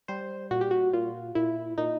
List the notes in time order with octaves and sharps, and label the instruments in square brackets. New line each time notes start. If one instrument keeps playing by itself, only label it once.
[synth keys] G3 C5
A#2 F#4
G4
F#4
A#2 F4
A#2 E4
A#2 D#4